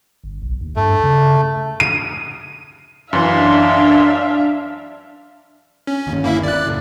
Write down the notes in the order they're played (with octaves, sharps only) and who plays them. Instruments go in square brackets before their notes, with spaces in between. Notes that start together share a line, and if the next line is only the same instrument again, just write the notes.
[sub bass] G1
B1
D#2
[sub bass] G2 [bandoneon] A3
[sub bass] C#3
[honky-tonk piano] D#7
[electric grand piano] F#2 E3 [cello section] D4 [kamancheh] E5 F5 [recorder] C6
[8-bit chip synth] C#4
[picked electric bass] G1 D#2
[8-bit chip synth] A#3 E4 E5
D5 F#6
[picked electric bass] F#1 A2